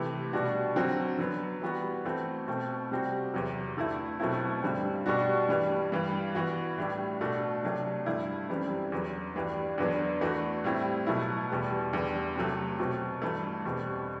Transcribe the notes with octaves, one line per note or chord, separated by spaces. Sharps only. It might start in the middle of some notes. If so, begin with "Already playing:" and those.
Already playing: C3 E3 A3
B2 G3 D4 F#4
D3 F#3 C4 F#4
D3 F#3 B3
E3 G3 B3 F#4
E3 A3 C4 F#4
B2 A3 C4
C3 G3 C4 F#4
E2 C3 F#3
D3 A3 E4
B2 F#3 A3 C4 E4
G2 D3 G3 C4
B2 G3 D4 F#4
G2 E3 G3
G2 E3 G3
E3 B3 F#4
A2 G3 D4
B2 A3 D4 F#4
C3 F#3 A3 D4
G2 D3 A3 E4
F#2 E3 G3 C4
E2 D3 F#3
G2 E3 G3 D4
E2 D3 F#3 B3 D4
E3 A3 D4 F#4
A2 G3 C4 E4
B2 F#3 A3 E4
E2 B2 G3 B3
E2 D3 G3
C3 F#3 A3
B2 F#3 C4
G2 E3 A3
E2 B2 G3 C4